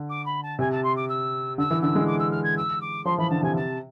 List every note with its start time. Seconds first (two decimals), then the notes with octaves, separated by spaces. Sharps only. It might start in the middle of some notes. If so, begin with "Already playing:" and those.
Already playing: D3
0.10 D6
0.26 B5
0.43 A5
0.59 C3 G#5
0.72 A5
0.84 C6
0.96 D6
1.09 E6
1.58 D3 E6
1.71 E3
1.82 D3 E6
1.95 G#3
2.07 D6
2.19 E6
2.31 F6
2.44 G#6
2.57 E6
2.81 D6
3.05 F3 C6
3.18 E3 B5
3.30 D3 A5
3.42 C3 G#5
3.56 A5